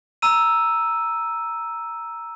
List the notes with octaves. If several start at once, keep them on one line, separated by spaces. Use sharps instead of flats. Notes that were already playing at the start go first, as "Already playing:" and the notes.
A#5 E6 D#7